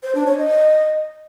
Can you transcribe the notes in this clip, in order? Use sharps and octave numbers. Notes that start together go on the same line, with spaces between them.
C5
D4
C#5
D#5